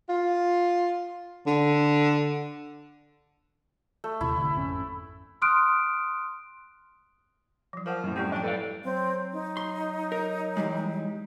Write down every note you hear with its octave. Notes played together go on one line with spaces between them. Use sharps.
F4
D3
A3
D#2 C3 E4
A1 D3
G#1 F2 C#4
C6 D#6 F6 F#6 D7
F3 F#3
F3 A#4 F#5
F#2 A2
G3 C4 C#4 G4
F3 D4 D5 G5
A4 B4 D5 F5
F#3 C4
D#4
C6
A#4
E3 G3 G#3